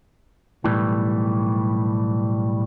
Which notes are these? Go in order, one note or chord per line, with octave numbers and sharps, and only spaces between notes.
B1 A2 E3 G3